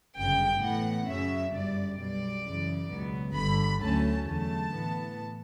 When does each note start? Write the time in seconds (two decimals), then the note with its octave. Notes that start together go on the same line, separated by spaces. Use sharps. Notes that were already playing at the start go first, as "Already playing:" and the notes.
0.16 G1 F#2 C#3 G5
0.61 A2 E3 B3 F#5
1.07 F#2 C#3 F#3 C#4 E5
1.52 G1 F#2 C#3 G3 D5
1.98 B1 B2 G3 D5
2.44 F#2 C#3 E3
2.90 C#2 B2 F#3 B3
3.35 G1 G2 D3 B5
3.81 D2 D3 F#3 A3 C#4 A5
4.26 E2 D3 F#3 A3 A5
4.72 A2 E3 B3